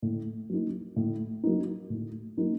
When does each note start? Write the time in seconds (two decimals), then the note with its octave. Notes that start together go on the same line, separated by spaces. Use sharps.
0.02 A2
0.50 F#3 A#3 D#4
0.96 A2
1.44 F#3 A#3 D#4
1.90 A2
2.37 F#3 A#3 D#4